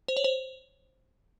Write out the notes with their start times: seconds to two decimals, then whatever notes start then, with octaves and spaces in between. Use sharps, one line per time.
0.08 C5
0.17 C#5
0.24 C5